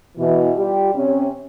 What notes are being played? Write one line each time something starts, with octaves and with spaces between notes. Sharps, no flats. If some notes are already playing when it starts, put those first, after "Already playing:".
B2 E3
G3 F4 G4
C3 C#4